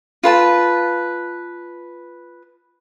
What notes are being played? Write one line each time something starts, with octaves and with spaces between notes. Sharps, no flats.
F4 B4 A5